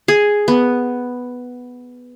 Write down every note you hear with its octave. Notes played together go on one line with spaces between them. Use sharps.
G#4
B3